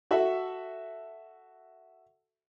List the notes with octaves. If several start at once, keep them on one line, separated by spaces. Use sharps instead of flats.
F#4 A4 E5